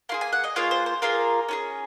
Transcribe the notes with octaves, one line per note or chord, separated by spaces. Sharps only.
A#3 F4 G#4 C6
G#5
F#5
D#5
A#3 F4 G#4 C#5
C5
C5
A#3 F4 G#4 A#4
C#4 F4 G#4